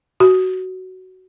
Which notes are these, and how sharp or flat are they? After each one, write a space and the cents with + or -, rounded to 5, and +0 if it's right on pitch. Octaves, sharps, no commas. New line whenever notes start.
F#4 +10